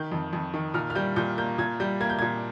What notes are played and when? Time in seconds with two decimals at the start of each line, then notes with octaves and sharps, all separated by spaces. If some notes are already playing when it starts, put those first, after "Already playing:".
Already playing: D#3 G6
0.12 F2
0.33 F2
0.54 D#3
0.74 A#2 F6
0.90 F6
0.95 G3 G6
1.16 A#2 G6
1.38 A#3 G6
1.58 A#2 G#6
1.80 G3 G6
2.01 A#3 G#6
2.09 G6
2.19 A#2 G#6